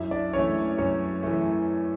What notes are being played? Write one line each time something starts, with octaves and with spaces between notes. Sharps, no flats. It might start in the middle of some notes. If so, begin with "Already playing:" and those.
Already playing: F#2 E4 E5
D4 D5
E3 A3 C#4 C#5
F#2 C#4 C#5
E3 A3